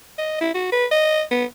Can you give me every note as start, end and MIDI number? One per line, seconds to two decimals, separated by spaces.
0.18 0.37 75
0.41 0.49 64
0.54 0.67 66
0.72 0.86 71
0.92 1.22 75
1.31 1.44 59